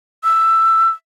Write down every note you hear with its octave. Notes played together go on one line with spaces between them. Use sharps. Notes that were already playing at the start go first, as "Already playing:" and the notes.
E6